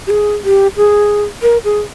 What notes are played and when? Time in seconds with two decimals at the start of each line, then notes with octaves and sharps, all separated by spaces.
0.07 G4
0.10 G#4
0.44 G4
0.77 G#4
1.42 A#4
1.64 G#4